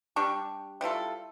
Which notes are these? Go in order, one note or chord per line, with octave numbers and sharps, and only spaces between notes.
G3 D4 G4 C#6
G3 E4 F4 A4